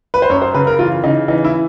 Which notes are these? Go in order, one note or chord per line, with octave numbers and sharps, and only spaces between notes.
B4
C5
F#2 C#5
C5
C#3 B4
A#4
E3 F4
C#3 D#4
E3 D#4
E4